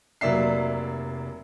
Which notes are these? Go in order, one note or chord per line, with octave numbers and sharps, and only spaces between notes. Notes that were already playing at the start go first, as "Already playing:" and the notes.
F1 F#3 A#3 D5 E5 C7